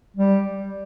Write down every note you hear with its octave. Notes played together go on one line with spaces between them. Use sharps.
G3